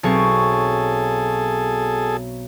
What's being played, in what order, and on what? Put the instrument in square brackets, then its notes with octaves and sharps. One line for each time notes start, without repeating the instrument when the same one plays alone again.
[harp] B1 C4 C#6 [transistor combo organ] G#4 A4